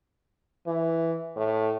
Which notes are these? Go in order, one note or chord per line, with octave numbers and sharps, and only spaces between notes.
E3
A2